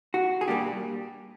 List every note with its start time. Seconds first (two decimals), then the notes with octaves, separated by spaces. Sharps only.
0.14 F#4
0.41 G#4
0.48 A#2 G3 A#3 D4 G4